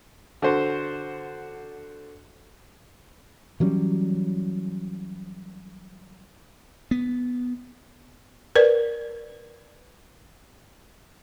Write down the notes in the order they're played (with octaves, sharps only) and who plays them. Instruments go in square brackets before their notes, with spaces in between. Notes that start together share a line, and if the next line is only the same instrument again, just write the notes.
[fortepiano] D3 F#4 C5
[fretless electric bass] E3 F#3 G3 C#4
[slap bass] B3
[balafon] A#4 B4 D5